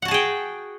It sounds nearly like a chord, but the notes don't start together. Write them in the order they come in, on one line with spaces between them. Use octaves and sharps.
F#5 F#4 A5 G#4 G5